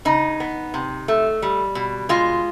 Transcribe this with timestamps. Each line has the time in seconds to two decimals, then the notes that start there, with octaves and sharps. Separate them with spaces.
0.05 C#3 D#4
0.40 B3
0.74 C3
1.08 A3
1.42 G3
1.75 B2
2.09 G#3 F4